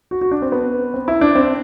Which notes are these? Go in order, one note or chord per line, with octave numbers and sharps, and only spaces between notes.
F#4
F#4
D4
C4
B3
C4
E4
D4
C4